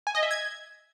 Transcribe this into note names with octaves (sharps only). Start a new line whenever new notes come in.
G#5
D#5
E5
G#6